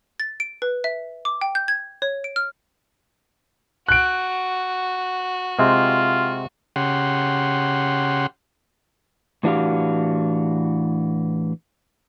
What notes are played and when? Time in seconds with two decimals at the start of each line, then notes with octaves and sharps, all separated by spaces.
0.20 A6
0.40 D7
0.62 B4
0.84 E5
1.25 D6
1.41 G5
1.55 G6
1.68 G#6
2.02 C#5
2.24 D7
2.36 F6
3.89 F#4 F#6 D7
5.59 C3 G#3 C4 F4
6.76 C#3 G4 F#5 C6
9.43 A2 E3 D4 F#4 G4 F5